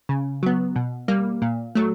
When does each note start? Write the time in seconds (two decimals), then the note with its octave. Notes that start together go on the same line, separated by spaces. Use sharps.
0.09 C#3
0.43 F#3 B3
0.76 B2
1.08 G3 A#3
1.42 A#2
1.75 F#3 A3